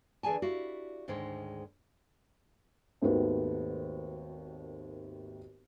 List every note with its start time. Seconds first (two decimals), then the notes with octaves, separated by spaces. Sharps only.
0.23 D3 E3 G#4 D5 G#5 A5
0.42 E4 F#4 G4 D5 F5
1.08 D2 G#2 D#3 G#3 C5 C#5
3.02 G#1 D#2 D#3 A3 B3 F#4